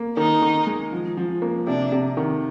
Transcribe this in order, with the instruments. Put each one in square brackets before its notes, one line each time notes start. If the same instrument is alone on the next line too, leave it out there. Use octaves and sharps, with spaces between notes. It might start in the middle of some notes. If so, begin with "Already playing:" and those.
Already playing: [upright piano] A#3
[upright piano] D#3 [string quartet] D#4
[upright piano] D#3
G#3
F3
F3
A#3
[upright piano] C3 [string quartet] D4
[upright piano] C3
D#3